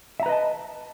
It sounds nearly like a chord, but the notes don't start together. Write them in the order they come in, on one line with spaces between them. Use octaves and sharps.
E5 A#5 B4 D#5 A5